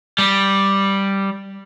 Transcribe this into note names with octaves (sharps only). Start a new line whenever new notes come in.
G3